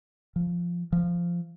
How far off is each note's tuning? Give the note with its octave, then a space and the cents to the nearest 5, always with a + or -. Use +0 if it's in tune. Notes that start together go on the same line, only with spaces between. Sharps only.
F3 -5
F3 -10